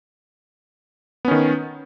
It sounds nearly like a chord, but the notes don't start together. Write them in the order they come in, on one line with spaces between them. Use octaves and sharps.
B3 C#4 D#3